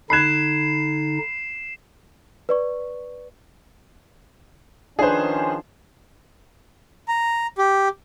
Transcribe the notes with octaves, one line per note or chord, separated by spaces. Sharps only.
D3 D#4 B5 F#6 G#6 C7 E7
B4 D5 C#6
D#3 F3 C#4 D4 G#4 B4 C5
A#5
G4